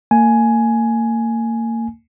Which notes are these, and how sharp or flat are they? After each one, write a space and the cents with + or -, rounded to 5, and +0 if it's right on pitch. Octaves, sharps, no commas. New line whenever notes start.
A#3 -35 G#5 +10